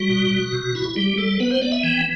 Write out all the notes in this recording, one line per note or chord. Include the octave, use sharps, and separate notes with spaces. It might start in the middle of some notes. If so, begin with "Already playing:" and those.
Already playing: G3 F#4
B2
B2
C3
E4
G3 G4
G3 A4
B3 B4
C5
B3 D5
E5
E3 G5